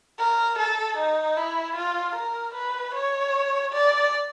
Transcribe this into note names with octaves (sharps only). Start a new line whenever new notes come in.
A#4
A4
D#4
E4
F4
A#4
B4
C#5
D5